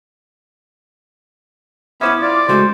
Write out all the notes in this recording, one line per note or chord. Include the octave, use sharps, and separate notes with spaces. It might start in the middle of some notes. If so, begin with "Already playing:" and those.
B3 C#4 E4 C5 E5 D6
F4 D5
C#3 G#3 A3 F#4 C5